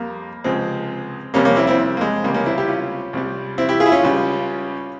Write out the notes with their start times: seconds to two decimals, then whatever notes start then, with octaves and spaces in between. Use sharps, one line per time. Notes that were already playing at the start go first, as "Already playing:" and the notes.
Already playing: F2 G3 A#3
0.44 C#2 C3 F3 G#3 C4
1.34 F2 C3 G3 A#3 C#4
1.45 A#3 C#4
1.56 C4 E4
1.67 C4 E4
1.97 A#3
2.01 G#3
2.24 C#2 C3 G3 A#3
2.34 A#3 C#4
2.46 C4 E4
2.58 E4 G4
2.68 C#4 F4
3.13 C2 C3 G3
3.58 C4 E4
3.69 E4 G4
3.80 F4 G#4
3.86 E4
3.92 C#4 F4
4.03 C#2 C#3 G3